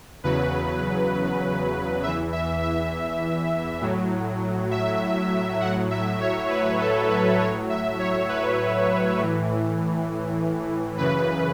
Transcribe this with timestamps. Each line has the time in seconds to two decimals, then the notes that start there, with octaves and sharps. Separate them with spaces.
0.24 E2 C#3 F#3 B4
2.03 E2 E3 E5
2.32 E5
2.62 E5
3.81 A2 F#3
4.71 E5
5.60 A2 F#3 F#5
5.91 E5
6.20 C#5
6.50 B4
6.80 A4
7.10 B4
7.39 A2 F#3 C#5
7.70 E5
7.99 C#5
8.29 B4
9.18 A2 E3
10.97 F#2 C#3 E3 B4